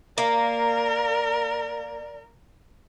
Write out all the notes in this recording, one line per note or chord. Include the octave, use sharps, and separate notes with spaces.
A#3 A#4 D5